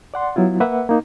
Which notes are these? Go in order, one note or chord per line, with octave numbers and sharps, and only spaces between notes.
D5 F#5 C6
F#3 B3 E4 F4
A#3 B4 E5 F#5
A#3 D#4